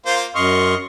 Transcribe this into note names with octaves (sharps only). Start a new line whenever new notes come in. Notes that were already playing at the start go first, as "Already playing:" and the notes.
A#3 F4 C5
F#2 D#5 C6 C#6 F6